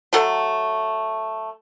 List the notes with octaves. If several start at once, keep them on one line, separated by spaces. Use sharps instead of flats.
F#3 A3 A4 F#5